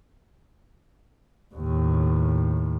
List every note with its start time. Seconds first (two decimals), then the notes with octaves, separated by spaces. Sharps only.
1.54 D#2 A2